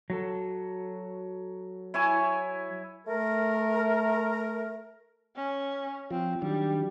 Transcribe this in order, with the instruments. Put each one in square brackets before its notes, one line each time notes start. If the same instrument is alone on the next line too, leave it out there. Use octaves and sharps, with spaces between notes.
[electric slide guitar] F#3 F#4 A4
[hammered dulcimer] E4 C#5 G#5
[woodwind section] A3 A#4
[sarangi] C#4
[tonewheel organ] F3 F4 [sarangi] C4
[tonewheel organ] D#3 F#3 D4 [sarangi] G3